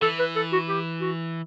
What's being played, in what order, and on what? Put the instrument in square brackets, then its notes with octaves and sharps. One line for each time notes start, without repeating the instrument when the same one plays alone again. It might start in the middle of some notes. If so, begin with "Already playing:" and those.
[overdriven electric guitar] E3 [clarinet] A4
[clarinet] B4
A4
F#4
G4
F#4